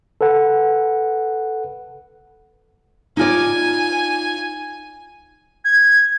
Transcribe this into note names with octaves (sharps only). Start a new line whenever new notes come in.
A4 B4 F#5
D#4 F4 D5 G#5
G#6